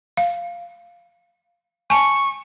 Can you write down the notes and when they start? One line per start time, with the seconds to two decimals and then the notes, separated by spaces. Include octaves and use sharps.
0.17 F5
1.90 G#5 A5 C#6